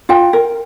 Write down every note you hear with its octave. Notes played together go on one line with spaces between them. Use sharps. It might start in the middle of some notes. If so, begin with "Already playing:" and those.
F4 G5
A#4